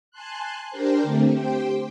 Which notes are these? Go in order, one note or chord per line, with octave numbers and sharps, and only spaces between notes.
G#5 A5 C6 F#6
D4 G4 A#4 C5
D3 A3 C4
G4 C5 G5